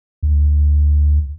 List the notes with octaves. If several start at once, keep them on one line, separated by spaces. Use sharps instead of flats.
D2